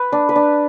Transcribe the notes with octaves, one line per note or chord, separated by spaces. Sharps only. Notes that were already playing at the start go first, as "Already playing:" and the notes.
Already playing: B4
D4
B4
D4